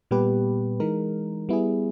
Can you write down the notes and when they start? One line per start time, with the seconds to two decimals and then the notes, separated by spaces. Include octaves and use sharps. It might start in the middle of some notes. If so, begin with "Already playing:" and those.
0.11 A#2 G3 B3 G4 B4
0.80 E3 G#3 D#4 A#4
1.49 G3 B3 E4 G#4